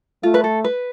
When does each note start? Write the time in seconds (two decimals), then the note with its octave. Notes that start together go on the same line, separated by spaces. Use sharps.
0.23 A3 F4
0.34 B4
0.44 A4
0.64 B4